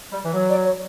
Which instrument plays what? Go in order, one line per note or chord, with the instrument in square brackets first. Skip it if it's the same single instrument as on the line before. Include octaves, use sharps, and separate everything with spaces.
[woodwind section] G3
E3
F#3
[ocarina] D5
C#5